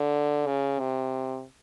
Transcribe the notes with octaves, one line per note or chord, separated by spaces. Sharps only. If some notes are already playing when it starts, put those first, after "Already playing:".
Already playing: D3
C#3
C3